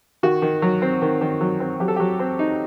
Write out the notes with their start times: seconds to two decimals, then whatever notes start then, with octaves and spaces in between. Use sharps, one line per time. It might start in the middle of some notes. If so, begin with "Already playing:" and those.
0.23 D#3 F#4
0.42 D#3
0.62 F#3
0.82 C4
1.02 D#3
1.21 D#3
1.41 F#3
1.60 C4
1.80 F#3 G4
1.88 A4
1.96 F#3 G4
2.19 C4
2.39 D#4